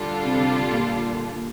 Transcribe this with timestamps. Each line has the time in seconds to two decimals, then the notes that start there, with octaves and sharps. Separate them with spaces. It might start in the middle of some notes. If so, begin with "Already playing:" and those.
Already playing: D3 G3 D4 F4 A4
0.25 C3
0.72 A#2